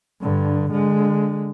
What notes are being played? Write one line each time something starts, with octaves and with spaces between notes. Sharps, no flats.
G2 D3
D3 G#3